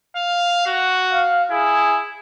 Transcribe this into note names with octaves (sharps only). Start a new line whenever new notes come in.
F5
F#4
F5
E4 G#4